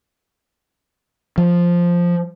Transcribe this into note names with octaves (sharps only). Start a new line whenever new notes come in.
F3